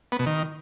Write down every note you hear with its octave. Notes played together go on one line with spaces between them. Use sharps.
B3
B2
D#3